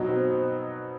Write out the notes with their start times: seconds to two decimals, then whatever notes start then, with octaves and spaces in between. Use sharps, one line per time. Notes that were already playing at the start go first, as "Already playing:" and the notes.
Already playing: B2 F#3 D#4
0.09 C4
0.30 C4